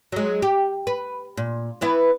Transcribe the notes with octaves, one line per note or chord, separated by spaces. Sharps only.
F#3 G#3
G4
B4
A#2
E3 B3 E4